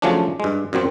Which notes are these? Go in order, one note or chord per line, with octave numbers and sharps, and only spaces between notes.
C#3 F3 F#3 A3 C#4 D4
G2 G#3
F#2 A#2 F#3 C4